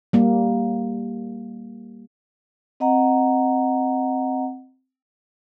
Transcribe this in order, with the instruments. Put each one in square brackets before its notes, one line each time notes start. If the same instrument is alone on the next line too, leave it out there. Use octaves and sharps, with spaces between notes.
[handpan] G3 A#3
[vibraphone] C4 D#5 F#5 A#5